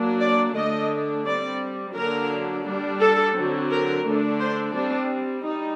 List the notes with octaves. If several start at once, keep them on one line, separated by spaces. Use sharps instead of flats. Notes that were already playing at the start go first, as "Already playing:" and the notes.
Already playing: F#3 A#3 D4
D5
D3 A3 D4 D#5
G3 C4 D5
D3 F#3 A#3 D4 A#4
G3 D4
A4
D3 F#3 C4
A#4
D3 A3 D4
C5
G3 C4 D4
G3 D#4